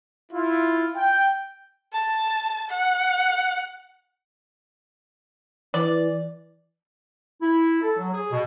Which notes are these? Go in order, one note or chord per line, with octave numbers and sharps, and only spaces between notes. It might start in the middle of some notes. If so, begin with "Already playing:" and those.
E4 F4
G5
A5
F#5
E3 D5
E4
A4
F#3
G#4
B2